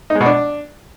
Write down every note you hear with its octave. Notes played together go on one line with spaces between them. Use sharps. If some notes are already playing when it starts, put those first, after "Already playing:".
D#4
G#3
B2
D4